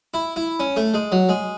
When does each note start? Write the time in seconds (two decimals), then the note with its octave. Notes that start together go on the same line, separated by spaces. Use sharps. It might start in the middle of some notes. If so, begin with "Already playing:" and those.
0.14 E4
0.36 E4
0.60 C#4
0.76 A3
0.94 G#3
1.12 F#3
1.29 G#3